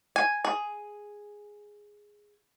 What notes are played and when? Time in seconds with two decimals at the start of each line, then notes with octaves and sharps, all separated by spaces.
0.16 G#5
0.45 G#4